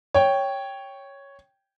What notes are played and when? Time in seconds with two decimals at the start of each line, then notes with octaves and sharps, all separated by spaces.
0.14 C#5 G5